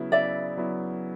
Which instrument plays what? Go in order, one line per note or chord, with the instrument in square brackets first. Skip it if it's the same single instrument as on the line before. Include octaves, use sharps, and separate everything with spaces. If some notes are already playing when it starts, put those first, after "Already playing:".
Already playing: [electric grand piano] C#3 F#3 B3 E4
[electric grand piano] C#3 [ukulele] D5 E5
[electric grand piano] F#3 B3 E4